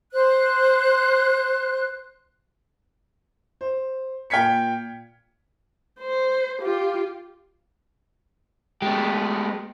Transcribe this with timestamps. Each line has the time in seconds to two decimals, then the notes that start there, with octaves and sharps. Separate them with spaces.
0.12 C5 F#6
3.61 C5
4.30 A#2 G5 F6 G#6 B6 C#7
6.00 C5
6.62 F4 G4
8.82 B2 G#3 A3 G4